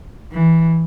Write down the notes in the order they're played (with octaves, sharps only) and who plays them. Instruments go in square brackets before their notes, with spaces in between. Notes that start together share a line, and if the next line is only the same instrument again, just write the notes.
[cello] E3